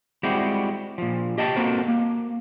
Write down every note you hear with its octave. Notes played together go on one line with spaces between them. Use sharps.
G3 G#3 C4 E4 F#4 G4
A#2 F3
G4 D#5 G5 A5
A#3 C4 F#4 A4 A#4 C5
A#3